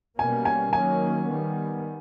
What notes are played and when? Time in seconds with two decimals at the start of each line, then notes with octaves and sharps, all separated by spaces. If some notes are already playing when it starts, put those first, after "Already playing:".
0.18 B2 G3 A#3 C#4 G#5
0.45 G#5
0.73 D#3 F#3 A#3 C#4 G#5
1.27 D#3 G3 B3